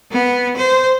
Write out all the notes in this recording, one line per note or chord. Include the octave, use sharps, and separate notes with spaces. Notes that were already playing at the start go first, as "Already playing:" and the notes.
B3
C5